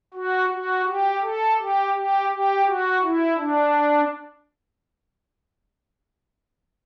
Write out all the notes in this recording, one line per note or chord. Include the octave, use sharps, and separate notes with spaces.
F#4
F#4
G4
A4
G4
G4
G4
F#4
E4
D4